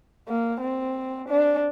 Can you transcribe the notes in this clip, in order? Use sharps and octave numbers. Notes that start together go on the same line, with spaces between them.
A#3
C4
D4